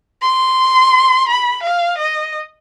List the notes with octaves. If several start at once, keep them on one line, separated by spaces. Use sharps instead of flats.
C6
B5
F5
D#5